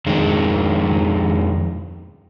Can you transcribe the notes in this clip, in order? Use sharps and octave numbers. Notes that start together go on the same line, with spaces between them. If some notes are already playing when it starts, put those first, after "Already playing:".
F2 D#3 G#3